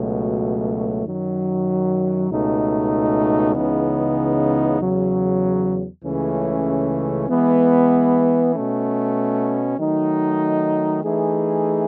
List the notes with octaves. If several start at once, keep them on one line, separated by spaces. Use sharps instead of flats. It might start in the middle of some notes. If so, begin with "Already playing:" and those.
Already playing: C#2 B2 F#3 A3
F#2 D#3 F#3
C#2 B2 A3 D#4
C#2 C#3 E3 B3 D#4
E2 C#3 F#3
C#2 C#3 E3 A3 C#4
E3 G#3 B3
B2 A3 C#4
D#3 F#3 A3 D#4
E3 A3 D#4 G#4